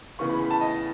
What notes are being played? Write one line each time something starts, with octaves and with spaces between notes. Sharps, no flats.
C#3 E3 B3 C#6
B5
B5
A5
D#5